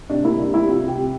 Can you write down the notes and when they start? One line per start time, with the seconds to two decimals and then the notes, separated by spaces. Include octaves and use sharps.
0.10 C3 D4
0.24 A#3 E4
0.39 G3 D4
0.54 G3 E4
0.68 C3 F4
0.83 C3 G4
0.98 C3